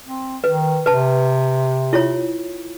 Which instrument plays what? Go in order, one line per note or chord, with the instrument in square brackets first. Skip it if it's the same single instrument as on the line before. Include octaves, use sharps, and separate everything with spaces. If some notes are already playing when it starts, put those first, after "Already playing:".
[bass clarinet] C4
[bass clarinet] D#3 [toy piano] B4
[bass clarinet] C3 [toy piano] B4 A5
[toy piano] E4 F4 C#5